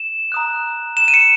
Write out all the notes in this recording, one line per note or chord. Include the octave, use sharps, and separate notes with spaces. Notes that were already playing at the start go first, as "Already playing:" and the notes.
Already playing: E7
A#5 D#6 F#6
E7
D#7
C#7